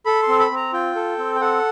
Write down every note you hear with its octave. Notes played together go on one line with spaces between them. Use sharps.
A4 B5
C6
C4
B5
C4 A#5
F4 G5
A4
C4
G5
A4 F#5